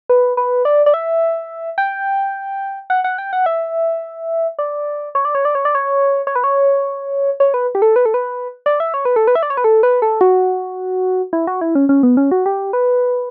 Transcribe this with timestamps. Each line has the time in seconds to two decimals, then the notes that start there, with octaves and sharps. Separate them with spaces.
0.09 B4
0.37 B4
0.65 D5
0.86 D5
0.94 E5
1.78 G5
2.90 F#5
3.04 F#5
3.18 G5
3.33 F#5
3.46 E5
4.59 D5
5.15 C#5
5.25 D5
5.35 C#5
5.45 D5
5.55 C#5
5.65 D5
5.75 C#5
6.27 C#5
6.35 B4
6.44 C#5
7.40 C#5
7.54 B4
7.75 G4
7.82 A4
7.96 B4
8.06 A4
8.14 B4
8.66 D5
8.80 E5
8.94 C#5
9.05 B4
9.16 A4
9.27 B4
9.35 E5
9.43 D5
9.50 C#5
9.57 B4
9.64 A4
9.83 B4
10.02 A4
10.21 F#4
11.33 E4
11.47 F#4
11.61 E4
11.75 C#4
11.89 C#4
12.03 B3
12.17 C#4
12.31 F#4
12.46 G4
12.73 B4